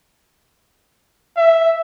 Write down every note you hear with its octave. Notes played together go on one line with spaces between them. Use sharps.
E5